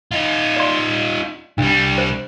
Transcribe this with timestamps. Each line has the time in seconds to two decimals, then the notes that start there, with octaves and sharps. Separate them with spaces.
0.11 D#4 F4
0.57 D5 C6
1.58 C2 G3 D4
1.98 C5